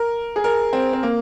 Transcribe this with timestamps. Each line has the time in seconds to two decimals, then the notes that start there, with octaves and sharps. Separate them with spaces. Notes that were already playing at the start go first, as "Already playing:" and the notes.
Already playing: A#4
0.36 G#4
0.44 A#4
0.73 C4
0.93 C4
1.03 A#3